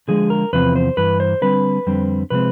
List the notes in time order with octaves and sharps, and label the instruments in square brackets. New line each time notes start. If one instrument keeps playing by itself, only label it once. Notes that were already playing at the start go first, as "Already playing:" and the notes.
[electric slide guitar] D3 F3 G#3 G#4
A#4
E2 C3 F3 C4 B4
C5
G2 E3 B4
C5
D3 G3 C4 B4
F2 D3 G3 C4
C3 F3 G#3 C4 B4